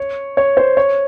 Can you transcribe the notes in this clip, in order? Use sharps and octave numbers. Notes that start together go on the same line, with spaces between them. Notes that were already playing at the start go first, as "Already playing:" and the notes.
Already playing: C#5
C#5
C5
C#5